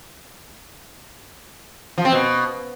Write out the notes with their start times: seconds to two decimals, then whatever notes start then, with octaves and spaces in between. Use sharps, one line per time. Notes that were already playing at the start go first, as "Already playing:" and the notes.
1.98 F3
2.05 C4
2.12 B2